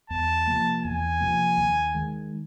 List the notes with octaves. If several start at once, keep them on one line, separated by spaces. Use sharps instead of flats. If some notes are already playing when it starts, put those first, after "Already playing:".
E2 A5
C3 F3 A#3
E2 G#5
C3 F3 A#3
D#2
D#3 G#3